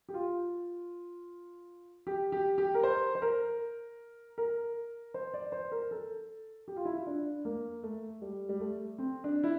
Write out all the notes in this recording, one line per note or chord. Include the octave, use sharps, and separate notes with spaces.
G4
F4
G4
G4
G4
A#4
C5
C5
A#4
A#4
C5
D5
C5
A#4
A4
G4
F4
E4
F4
D4
A#3
A3
G3
G3
A3
C4
D4
E4